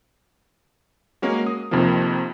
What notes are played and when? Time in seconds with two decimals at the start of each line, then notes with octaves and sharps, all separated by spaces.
1.22 G#3 A#3 C#4 F#4
1.47 D#6
1.71 F2 C3 D#3 F3 A#3